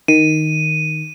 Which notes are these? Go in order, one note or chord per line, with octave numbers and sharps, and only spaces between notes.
D#3 D#7